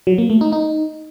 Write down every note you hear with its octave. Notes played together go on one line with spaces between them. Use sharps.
F#3
A#3
A3
D#4
D#4